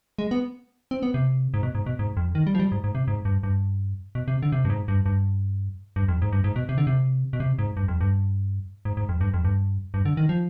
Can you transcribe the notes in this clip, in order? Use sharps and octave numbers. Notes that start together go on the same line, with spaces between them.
G#3
B3
C4
B3
C3
G#2
B2
G#2
B2
G#2
F2
D#3
G3
F3
G3
G#2
G#2
C3
G#2
G2
G2
B2
C3
D3
C3
G2
G#2
G2
G2
G2
F2
G#2
G2
G#2
B2
C3
D3
C3
B2
C3
G#2
G2
F2
G2
G#2
G#2
F2
G2
F2
G2
G2
D3
D#3
F3